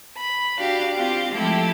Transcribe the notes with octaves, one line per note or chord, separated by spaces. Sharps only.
B5
D4 F#4 G4 F5
C4 F4 G4 F5
F3 G#3 A3 E4 G4 A4